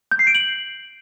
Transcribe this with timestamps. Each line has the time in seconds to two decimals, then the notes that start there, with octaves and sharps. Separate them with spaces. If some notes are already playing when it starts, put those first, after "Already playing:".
0.11 G6
0.19 C7
0.27 D7
0.35 F#7